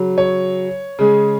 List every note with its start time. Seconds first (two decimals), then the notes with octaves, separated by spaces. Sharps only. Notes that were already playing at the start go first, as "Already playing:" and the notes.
Already playing: C#3 F#3
0.18 C#5
0.99 C#3 G#3